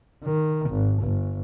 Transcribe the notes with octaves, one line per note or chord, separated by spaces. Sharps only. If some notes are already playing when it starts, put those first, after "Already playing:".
D#3
G#1
G1